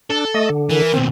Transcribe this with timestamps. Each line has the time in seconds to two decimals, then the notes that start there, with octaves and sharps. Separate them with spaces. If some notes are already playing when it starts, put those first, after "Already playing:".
0.10 D4 A4
0.34 A3 D#5
0.50 D3
0.70 E3 A#4
0.94 D#2 B2 C4